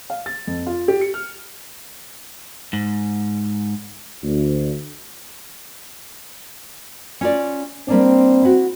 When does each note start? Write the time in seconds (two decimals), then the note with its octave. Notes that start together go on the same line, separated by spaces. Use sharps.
0.10 F5
0.26 A6
0.47 F2
0.67 F4
0.88 G4
1.01 C#7
1.14 F6
2.73 G#2
4.23 D2
7.21 C#4 F4 D5
7.88 G3 A#3 C4 D4
8.42 E4 F#4